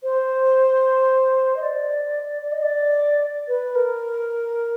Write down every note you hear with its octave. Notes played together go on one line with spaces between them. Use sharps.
C5
D#5
D5
D5
D#5
D5
B4
A#4